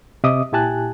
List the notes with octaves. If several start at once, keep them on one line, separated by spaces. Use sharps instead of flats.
C3 D#5 E5 D6 D#6
A#2 E4 G4 G#5 A5 F#6